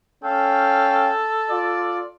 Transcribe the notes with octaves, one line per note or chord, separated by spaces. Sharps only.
C#4 A4 F5 G5
F4 D5